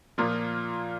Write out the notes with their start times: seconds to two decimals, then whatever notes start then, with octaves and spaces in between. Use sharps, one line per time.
0.18 A#2 F3 A#3 F4